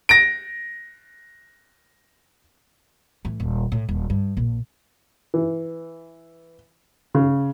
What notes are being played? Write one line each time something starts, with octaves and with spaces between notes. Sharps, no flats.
A#6 D7
A2 E3
D#1
A2
D#1
G2
A#1 A#2
E3
C#3